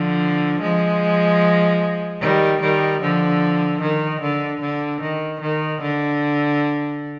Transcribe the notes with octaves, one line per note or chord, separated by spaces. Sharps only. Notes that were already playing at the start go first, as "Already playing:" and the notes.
Already playing: D3 F3
F3 G#3
D#3 G3
D#3 G3
D3 F3
D#3
D3
D3
D#3
D#3
D3